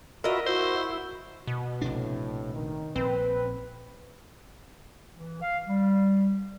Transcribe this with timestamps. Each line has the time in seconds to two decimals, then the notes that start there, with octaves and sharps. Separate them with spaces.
0.24 F4 F#4 A#4 B4 D#5 E5
0.46 E4 F#4 C5
1.47 B2
1.82 A#1 A2 C3 D4
2.53 D#3
2.96 A#1 C4 B4
5.16 E3
5.42 F5
5.67 G3